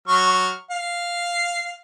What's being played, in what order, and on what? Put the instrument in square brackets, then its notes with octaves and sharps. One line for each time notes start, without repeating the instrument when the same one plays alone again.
[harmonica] F#3 C#6 F6
F5